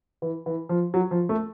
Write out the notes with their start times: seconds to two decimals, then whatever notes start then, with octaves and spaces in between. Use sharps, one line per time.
0.22 E3
0.46 E3
0.69 F3
0.94 F#3
1.11 F3
1.29 A3